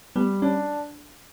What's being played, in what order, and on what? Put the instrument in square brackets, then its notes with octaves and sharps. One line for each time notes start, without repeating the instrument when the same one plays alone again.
[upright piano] G3 [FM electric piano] B3
[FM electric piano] C#4 [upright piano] D4